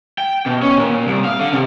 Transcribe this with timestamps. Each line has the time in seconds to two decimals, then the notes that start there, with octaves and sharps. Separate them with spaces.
0.18 G5
0.46 B2
0.62 C#4
0.78 A#2
1.07 C2
1.25 F5
1.39 D3
1.52 C3